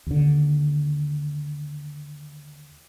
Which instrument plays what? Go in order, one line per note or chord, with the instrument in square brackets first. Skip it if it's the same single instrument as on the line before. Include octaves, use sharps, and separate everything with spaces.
[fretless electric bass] D#2 D3